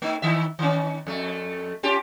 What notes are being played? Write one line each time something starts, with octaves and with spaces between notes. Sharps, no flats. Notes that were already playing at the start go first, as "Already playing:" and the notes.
A3 D#4
D#3 E5
D#3 C#4
F2 A3
C#4 F4 G4